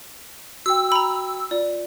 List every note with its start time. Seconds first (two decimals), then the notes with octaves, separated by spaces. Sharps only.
0.66 F#4 G5 E6
0.92 A#5 B5
1.51 F4 D5